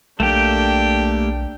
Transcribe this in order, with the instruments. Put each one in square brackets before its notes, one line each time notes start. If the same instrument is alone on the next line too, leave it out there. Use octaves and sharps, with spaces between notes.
[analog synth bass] B1 [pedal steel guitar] A3 A#3 G4 [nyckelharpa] D4 G5